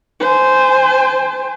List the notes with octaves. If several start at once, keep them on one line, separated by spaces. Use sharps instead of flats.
C5 G#5